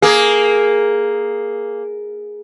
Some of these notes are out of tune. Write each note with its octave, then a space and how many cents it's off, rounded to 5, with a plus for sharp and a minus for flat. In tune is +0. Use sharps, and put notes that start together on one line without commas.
A#3 +0 G#4 +0